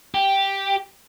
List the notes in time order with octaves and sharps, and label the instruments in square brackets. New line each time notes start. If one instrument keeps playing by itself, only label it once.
[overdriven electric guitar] G4